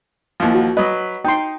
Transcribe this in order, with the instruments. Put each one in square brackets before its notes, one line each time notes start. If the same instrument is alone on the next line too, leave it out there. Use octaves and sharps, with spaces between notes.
[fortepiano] D#2 E3 F3
[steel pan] F#4
[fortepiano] F#3 B4 [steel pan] D#5
[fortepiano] D#4 [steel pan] G5 C6